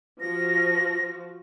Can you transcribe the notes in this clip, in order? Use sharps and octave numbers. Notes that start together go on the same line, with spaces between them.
F3 F4 F#4 A#6